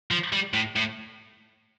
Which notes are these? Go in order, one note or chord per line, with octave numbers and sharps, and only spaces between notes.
F3
G3
A2
A2